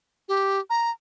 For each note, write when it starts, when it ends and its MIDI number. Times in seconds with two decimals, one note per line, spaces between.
0.29 0.59 67
0.70 0.91 82